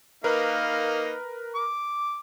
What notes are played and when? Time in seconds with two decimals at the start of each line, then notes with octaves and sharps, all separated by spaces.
0.24 A#3 D#4 A#4 B4 F5
1.55 D6